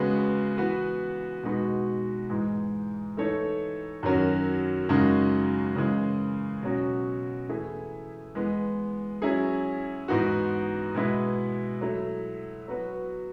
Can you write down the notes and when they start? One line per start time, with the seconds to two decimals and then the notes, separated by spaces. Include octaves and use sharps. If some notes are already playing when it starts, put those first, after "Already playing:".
Already playing: C#3 G#3 B3 F#4 B4
0.57 E3 B3 F#4 B4
1.43 B2 G#3 D#4 F#4 B4
2.30 G#2 E3 G#3
3.17 E3 A3 D#4 A4 C#5
4.03 F#2 D#3 F#3 C#4 F#4
4.89 F#2 C#3 G#3 D#4 F#4
5.76 C#3 E3 G#3
6.63 B2 F#3 C#4 F#4
7.49 E3 A3 E4 G#4
8.35 E3 G#3 B3
9.22 F#3 C#4 E4 G#4
10.08 G#2 E3 B3 D#4 F#4
10.94 B2 G#3 B3 E4 B4
11.81 F#3 A3 E4
12.68 F#3 B3 F#4 B4